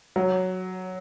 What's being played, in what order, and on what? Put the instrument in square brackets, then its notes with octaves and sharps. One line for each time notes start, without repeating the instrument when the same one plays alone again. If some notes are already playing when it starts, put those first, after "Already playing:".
[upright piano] F#3